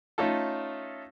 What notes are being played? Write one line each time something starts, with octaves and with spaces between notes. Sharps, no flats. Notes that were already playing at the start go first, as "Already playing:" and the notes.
A3 C#4 D#4 F4 A4